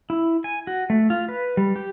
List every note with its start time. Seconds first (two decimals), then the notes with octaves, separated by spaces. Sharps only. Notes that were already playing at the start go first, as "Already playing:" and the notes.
0.10 E4
0.44 G#5
0.67 F#4
0.90 A3
1.10 F4
1.29 B4
1.57 G3
1.76 G4